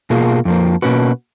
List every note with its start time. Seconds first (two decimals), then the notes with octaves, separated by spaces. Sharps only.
0.10 B2 A#3 F4 G#4
0.45 F2 F3 A#3
0.82 B2 A#3 C#4 F#4 B4